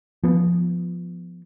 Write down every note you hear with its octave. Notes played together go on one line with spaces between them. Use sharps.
F3 B3